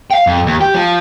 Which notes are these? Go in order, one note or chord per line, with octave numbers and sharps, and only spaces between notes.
F5 G5
F2
D#2
G4
F3